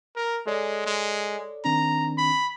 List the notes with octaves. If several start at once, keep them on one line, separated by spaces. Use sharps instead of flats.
A#4
G#3 A4 C#5 D5
G#3
D#3 C4 D4 A#5
B5